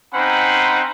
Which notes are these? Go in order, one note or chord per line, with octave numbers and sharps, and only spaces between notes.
C4 C#4 D#4 C5 F#5 B5